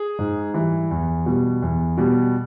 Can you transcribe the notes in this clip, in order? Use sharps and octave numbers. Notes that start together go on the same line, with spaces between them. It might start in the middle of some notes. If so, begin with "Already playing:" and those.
Already playing: G#4
G#2
E3 G3
E2
B2 G3
E2
B2 G3